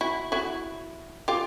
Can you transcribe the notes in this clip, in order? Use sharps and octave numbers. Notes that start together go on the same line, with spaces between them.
E4 F#4
E4 F#4
F4 G4